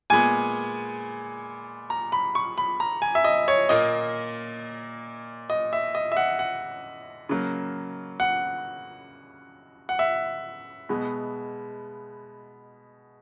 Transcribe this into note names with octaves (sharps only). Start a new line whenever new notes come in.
A#2 G#3 B3 G#5
A#5
B5
C#6
B5
A#5
G#5
E5
D#5
C#5
A#2 A#3 D#5
D#5
E5
D#5
E5
F#5
F#5
C#3 F#3 A#3
F#5
F#5
E5
B2 G#3 B3